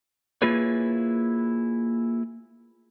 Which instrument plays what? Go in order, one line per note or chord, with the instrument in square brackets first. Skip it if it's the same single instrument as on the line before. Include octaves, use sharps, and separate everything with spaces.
[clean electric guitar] A#3 E4 F4 G#4 B4 C#5